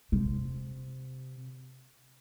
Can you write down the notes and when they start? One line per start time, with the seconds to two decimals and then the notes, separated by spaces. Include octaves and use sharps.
0.12 C3